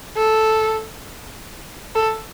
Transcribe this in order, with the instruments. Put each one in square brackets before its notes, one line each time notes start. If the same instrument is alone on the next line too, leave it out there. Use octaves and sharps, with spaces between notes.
[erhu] A4
A4